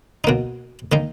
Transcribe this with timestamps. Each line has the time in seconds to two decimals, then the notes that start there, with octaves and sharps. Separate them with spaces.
0.24 B2 A#3 D#4
0.92 D#3 A#3 D#4